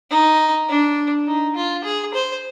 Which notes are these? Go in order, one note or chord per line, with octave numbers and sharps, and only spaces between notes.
D#4
D4
D#4
F4
G#4
C5